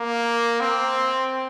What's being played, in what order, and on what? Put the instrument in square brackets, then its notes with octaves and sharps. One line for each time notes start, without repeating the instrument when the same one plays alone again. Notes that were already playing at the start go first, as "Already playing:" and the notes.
Already playing: [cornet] A#3
C4